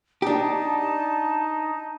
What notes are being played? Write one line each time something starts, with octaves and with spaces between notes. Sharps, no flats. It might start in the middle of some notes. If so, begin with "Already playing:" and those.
D4 D#4 G4 A5